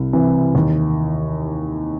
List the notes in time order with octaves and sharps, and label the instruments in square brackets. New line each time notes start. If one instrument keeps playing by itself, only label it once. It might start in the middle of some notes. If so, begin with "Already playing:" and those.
Already playing: [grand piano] C2
C3 E3
D#2